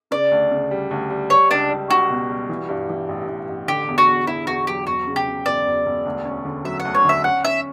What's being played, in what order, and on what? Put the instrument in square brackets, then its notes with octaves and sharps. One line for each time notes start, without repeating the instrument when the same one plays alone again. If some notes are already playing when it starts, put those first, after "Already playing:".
[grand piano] C#3 [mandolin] D5
[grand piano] D2
C#3
G3
D2
G3
[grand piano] G3 [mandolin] C#5
[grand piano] C#2 [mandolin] D4
[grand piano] G3
[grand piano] C#2 [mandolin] F#4
[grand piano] B2
G3
E3
G2
E3
A1
A1
A1
[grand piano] D3 [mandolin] G4
[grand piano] E2
[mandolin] F#4
[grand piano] E2
[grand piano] E2 [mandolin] E4
[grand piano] E2 [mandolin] F#4
[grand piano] F#3 [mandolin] G4
[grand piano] E1 [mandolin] F#4
[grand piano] C#3
[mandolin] G4
[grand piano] C#3
[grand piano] E1 [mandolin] D5
[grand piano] E1
E1
D2
C#4
D3
[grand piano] F#3 [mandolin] E5
[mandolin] F#5
[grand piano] D2
[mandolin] C#5
[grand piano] D3 [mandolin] E5
[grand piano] C#4 [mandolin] F#5
[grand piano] C#4 [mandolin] E5